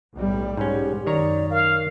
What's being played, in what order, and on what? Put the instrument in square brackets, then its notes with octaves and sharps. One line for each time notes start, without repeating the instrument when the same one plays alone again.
[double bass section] B1 A2 G3
[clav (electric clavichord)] G#2 C#4 [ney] G4
[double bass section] F#2 [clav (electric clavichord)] D#3 C#5 A#5 [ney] D5
[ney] A#4 [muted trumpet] F5